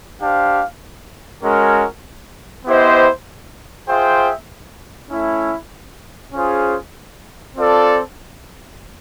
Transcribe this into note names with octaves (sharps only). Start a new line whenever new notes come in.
D4 G4 C5 F5
G#3 C#4 F#4 A#4
B3 E4 G4 C5 D#5
F4 G#4 C5 E5 G5
A3 C#4 E4
C#4 F4 G#4 C5
C4 F4 A4 D5